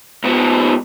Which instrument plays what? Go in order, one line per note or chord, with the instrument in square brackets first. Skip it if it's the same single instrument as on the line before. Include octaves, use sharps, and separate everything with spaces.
[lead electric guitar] G#2 B3